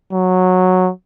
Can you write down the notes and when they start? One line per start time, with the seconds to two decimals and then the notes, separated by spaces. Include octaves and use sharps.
0.12 F#3